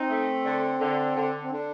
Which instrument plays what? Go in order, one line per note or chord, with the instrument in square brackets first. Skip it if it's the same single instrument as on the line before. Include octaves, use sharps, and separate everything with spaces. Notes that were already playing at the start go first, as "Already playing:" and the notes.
Already playing: [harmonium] C4 [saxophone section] D#4
[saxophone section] A3
D3
D3
D3
[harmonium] C4
[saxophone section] D3 [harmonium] D4